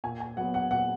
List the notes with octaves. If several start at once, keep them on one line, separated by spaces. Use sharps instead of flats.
A#2 G#5
G#5
F#3 B3 F#5
F#5
A#2 F#5